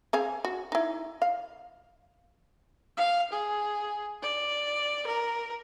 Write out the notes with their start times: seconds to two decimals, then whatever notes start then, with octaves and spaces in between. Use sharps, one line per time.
0.13 C4 G#4 F5
0.44 F#4
0.72 D#4 E4
1.22 F5
2.97 F5
3.33 G#4
4.23 D5
5.07 A#4